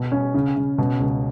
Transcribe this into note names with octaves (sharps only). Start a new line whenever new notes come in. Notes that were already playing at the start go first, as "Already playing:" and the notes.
Already playing: B2
C#4
C#3
C#3
B2
C#2